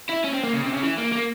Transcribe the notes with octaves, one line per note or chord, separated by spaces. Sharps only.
E4
C#4
C4
A#3
C#3
C3
C#3
E3
A#3
A#3